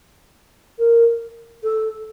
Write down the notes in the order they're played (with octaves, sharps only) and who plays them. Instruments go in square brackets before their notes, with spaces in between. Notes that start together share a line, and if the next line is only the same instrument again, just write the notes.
[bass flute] A#4
A4